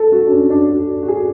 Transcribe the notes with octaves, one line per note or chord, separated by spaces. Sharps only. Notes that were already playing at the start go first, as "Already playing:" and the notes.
Already playing: A4
F#4
D4
C#4
D4
F#4
F#4
G#4